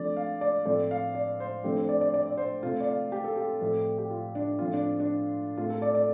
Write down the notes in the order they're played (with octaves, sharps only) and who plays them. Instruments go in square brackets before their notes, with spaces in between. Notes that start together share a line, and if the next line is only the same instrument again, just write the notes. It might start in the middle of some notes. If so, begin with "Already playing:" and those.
Already playing: [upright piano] D3 F3 A3 C4 D5
F5
D5
A2 F3 A3 C4 D5
F5
D5
C5
D3 F3 A3 C4 G4
C5
D5
D5
D5
D5
C5
C3 A3 C4 F4
D5
F5
G4
A4
G4
A2 F3 A3 C4
G4
F4
D4
A2 F3 C4 F4
D4
D4
A2 A3 C4 F4
A4
D5
D5